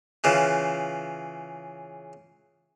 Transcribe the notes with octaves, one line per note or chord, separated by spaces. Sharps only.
C#3 E3 F4